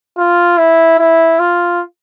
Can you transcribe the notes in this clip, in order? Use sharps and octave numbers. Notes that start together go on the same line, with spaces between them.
F4
E4
E4
F4